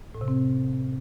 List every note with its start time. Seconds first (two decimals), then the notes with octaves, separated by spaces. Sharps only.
0.15 A2
0.21 C3
0.28 C4